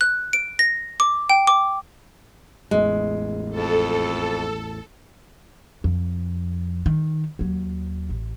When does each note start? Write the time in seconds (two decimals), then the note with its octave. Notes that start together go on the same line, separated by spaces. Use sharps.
0.01 F#6
0.33 D7
0.59 A#6
1.00 D6
1.30 G5
1.47 D6
2.71 A1 E2 G#3
3.50 F2 A4
5.84 F2
6.86 D#3
7.39 D#2 F#3
8.09 A1